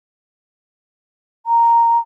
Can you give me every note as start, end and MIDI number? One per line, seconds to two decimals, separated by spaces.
1.46 1.98 82